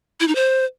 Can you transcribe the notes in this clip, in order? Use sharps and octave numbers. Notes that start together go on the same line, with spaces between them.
E4
D#4
C5